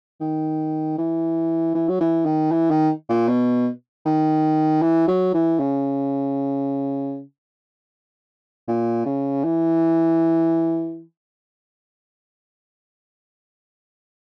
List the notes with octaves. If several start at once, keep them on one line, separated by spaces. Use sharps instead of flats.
D#3
E3
E3
F#3
E3
D#3
E3
D#3
A#2
B2
D#3
E3
F#3
E3
C#3
A#2
C#3
E3